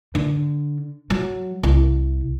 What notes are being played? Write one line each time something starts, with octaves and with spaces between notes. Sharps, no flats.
D3
F#3
C2